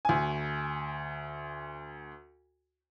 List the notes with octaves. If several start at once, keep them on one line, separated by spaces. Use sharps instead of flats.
D2 G#5